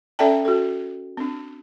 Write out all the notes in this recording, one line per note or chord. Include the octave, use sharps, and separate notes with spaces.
C#4 A4 D5 E5 G5 A5
F#4 A4
C4 D4